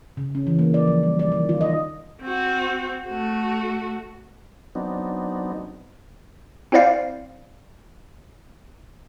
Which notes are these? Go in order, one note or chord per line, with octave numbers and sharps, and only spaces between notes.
C#3
C#4
E3
A#3
D5
F3
G3
D5
D#3
F4
D#5
C4 F#4
A3 F#4
F#3 B3 C4 D4 D#4
C4 E4 C5 D5 F5